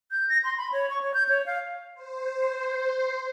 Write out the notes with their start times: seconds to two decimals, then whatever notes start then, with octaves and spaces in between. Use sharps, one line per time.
0.11 G6
0.29 A#6
0.44 C6
0.58 B5
0.72 C#5
0.90 C#6
1.01 C#5
1.14 G6
1.29 C#5
1.46 F5
1.95 C5